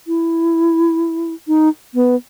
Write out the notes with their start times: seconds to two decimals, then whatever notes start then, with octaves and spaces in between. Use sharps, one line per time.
0.07 E4
1.48 D#4
1.94 B3